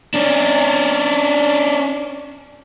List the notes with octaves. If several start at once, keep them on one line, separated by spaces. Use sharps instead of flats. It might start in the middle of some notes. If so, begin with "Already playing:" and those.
C#4 D4